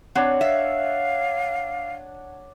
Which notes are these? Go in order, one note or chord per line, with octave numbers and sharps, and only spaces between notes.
C4 D4 C#5 F#5
E5 F5